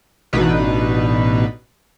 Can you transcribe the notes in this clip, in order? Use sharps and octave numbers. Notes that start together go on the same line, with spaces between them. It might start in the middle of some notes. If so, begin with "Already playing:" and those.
A1 B2 D4 D#4 B4